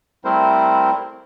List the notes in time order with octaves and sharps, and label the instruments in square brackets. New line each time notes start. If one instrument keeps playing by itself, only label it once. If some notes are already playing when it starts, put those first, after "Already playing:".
[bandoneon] G3 A3 C4 E4 A#4 C5